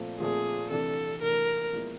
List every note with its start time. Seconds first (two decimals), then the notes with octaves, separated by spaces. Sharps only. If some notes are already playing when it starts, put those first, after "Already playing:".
Already playing: A#2 F3 A3 C4
0.20 A#2 F3 A3 C4 G#4
0.71 C2 C3 E3 A3 D4 A4
1.22 C2 C3 E3 A3 D4 A#4
1.73 A#2 F3 G#3 B3 E4